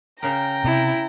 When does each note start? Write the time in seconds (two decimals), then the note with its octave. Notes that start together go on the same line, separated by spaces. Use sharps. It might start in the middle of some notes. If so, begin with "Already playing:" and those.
0.22 C#3 A#4 G5 A#5
0.64 C3 E4